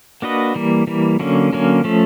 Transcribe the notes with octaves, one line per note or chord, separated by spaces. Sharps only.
A#3 D4 F#4 B4 D#5
E3 G3 A#3
E3 G3 A#3
D3 F#3 A#3 C#4
D3 F#3 A#3 C#4
F3 A3 C#4